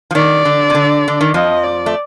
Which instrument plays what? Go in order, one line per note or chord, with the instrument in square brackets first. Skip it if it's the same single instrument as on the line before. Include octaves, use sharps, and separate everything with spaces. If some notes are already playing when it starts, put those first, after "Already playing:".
[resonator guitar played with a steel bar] F3
[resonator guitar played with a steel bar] D#3 [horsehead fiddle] D5
[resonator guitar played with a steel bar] D3
C3
D3
D3
D#3
[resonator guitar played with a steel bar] F2 F3 [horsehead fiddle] D#5
[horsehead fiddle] D5
[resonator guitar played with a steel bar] A3